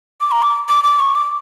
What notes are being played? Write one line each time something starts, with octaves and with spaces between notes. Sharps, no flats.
D6
A#5
D6
D6
D6
C#6
D6